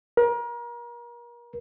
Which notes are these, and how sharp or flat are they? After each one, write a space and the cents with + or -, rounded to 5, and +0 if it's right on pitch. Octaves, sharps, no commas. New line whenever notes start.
A#4 +35